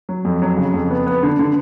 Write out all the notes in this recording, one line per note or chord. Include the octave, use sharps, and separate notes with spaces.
F#3
F2
F#3
C#3
F2
B3
B3
D3
D3